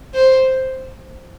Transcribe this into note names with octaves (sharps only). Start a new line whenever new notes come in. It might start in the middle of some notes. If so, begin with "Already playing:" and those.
C5